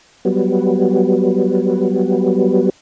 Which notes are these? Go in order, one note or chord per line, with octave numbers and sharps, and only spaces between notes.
F#3 G3 B3